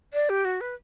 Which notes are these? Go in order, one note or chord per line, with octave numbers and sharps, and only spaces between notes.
D5
G4
F#4
B4